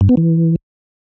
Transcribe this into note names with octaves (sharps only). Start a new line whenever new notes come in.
G2
B3
E3